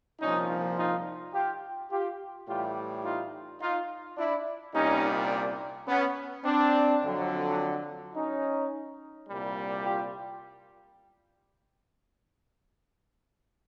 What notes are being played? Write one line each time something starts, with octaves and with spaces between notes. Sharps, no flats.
C2 A#2 F3 C#4 D#4
D#4 F4
F4 G4
F4 G4
A2 E3 G3 F4 G4
D#4 F4
D#4 F4
D4 E4
C2 A#2 G3 C#4 D#4
B3 C#4
C4 D4
F2 D3 F#3
C#4 D#4
C2 A#2 G3
F4 G4